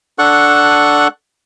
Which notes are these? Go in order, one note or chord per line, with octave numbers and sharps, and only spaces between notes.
D4 A4 F#5 C#6 F#6